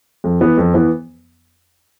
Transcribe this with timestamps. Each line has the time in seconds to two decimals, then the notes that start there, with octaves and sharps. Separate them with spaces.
0.24 F2
0.41 E3 B3
0.58 F2
0.74 E3 B3